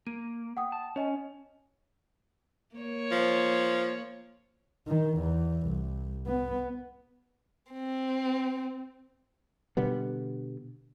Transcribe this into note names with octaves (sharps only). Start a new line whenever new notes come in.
A#3 D#7
F#5 G5 D#6
A5
C#4 C#5 D#5 G#5
A#3 C#5
F3
D#3
E2
C2
B3
C4
B2 D3 G3 B3